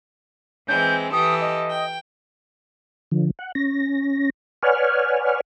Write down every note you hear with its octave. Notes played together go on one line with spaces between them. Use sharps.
E3 G#3 C4 G6
E3 G4 A4 D#6
D#5
G5
D3 F3
F#5
C#4 A#6
B4 C#5 D5 F#5 G#5 F6